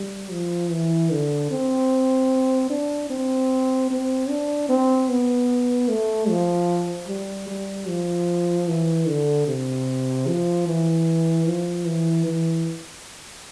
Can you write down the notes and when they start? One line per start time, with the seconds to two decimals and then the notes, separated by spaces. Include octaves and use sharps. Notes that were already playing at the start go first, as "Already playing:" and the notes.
Already playing: G3
0.31 F3
0.71 E3
1.12 D3
1.51 C4
2.70 D4
3.10 C4
3.90 C4
4.29 D4
4.69 C4
5.09 B3
5.88 A3
6.29 F3
7.08 G3
7.48 G3
7.88 F3
8.68 E3
9.08 D3
9.47 C3
10.27 F3
10.67 E3
11.47 F3
11.86 E3
12.26 E3